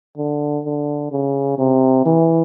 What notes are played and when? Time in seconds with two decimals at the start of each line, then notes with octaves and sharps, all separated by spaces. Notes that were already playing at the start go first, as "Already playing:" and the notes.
0.17 D3
0.65 D3
1.12 C#3
1.58 C3
2.06 E3